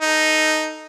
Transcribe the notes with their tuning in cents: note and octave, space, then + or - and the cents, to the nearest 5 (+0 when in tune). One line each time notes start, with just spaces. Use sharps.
D#4 +0 A4 +0